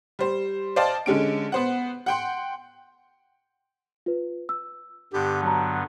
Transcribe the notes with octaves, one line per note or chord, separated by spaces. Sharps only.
G3 C5
C5 D5 D#5 F5 G5 A5
D3 G#3 C#4 D7
B3 C5 F#5
F#5 G5 C6
F4 B4
E6
G2 D3 B3 G4
F#3 A5 A#5